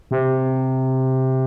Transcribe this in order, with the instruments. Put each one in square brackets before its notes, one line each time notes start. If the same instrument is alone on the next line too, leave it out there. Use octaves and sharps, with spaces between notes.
[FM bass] C3